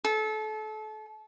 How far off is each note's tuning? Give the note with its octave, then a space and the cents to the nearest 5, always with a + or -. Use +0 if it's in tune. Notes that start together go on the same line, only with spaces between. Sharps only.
A4 -30